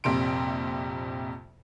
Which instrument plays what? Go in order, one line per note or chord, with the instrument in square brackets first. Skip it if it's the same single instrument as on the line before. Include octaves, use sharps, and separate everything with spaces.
[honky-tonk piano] A#1 F2 C3 C6 D7